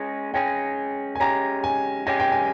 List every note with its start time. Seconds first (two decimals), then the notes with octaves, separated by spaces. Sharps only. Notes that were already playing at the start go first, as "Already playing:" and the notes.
Already playing: G#3 C#4 G#4
0.34 G#3 C#4 G#4 G5
1.15 G#5
1.20 G#3 C#4 G4 A#5
1.64 G#5
2.07 G#3 C#4 G4 G#5
2.20 G5
2.32 G#5